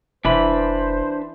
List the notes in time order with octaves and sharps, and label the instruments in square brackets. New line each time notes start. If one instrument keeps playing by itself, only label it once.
[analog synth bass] F1 [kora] E3 [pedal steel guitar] D4 B4 B5 [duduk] C5